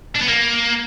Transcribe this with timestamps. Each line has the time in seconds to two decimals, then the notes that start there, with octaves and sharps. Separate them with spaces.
0.15 D4
0.22 B3
0.28 A#3